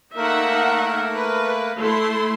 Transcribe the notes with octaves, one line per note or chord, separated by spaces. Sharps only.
A3 A#3 D#4 A#4 E5 F#5
B4
A3 E4 C6